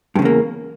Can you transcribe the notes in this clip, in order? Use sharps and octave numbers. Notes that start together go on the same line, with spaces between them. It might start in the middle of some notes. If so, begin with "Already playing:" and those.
E2 G2 C#3 A#3